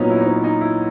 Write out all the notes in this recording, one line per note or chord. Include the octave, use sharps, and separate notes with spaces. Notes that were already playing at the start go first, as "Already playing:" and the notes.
Already playing: A#2 F#3 B3 C#4 D#4
E4
D#4
C#4
D#4
E4